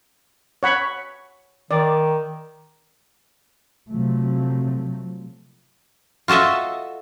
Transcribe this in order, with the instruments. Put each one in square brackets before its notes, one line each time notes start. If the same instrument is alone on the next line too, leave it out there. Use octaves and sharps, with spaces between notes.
[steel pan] C#5 F#5 B5
[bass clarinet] D#3 [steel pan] D5
[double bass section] C3 F3 F#3 A3
[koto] F4 F#4 A4 D#5 E5